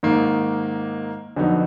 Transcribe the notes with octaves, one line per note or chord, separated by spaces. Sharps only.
G#2 D#3 A#3
F2 D3 F#3 B3 D#4